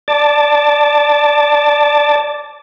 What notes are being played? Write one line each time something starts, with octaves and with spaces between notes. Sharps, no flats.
D5 A5